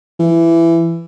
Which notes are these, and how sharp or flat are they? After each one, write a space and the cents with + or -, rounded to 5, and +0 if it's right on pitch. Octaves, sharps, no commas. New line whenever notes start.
E3 +15